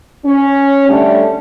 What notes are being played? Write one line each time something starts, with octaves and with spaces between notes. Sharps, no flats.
C#4
D3 G3 A3 D4